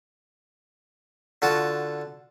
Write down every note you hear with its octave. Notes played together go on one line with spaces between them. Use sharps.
D3 F4 F#4 A5